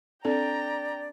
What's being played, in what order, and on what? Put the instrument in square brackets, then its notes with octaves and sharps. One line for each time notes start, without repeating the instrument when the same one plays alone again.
[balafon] C4 A4 [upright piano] D4 [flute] D5 [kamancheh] G5 A#5